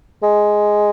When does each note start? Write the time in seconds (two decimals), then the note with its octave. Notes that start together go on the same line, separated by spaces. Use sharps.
0.23 G#3